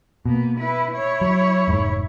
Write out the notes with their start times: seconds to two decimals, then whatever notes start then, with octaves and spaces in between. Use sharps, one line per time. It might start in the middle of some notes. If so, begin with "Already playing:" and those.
0.26 B2 A#3 B3
0.59 E4 B4
0.91 E4 C#5
1.21 F#3
1.68 F1 G#2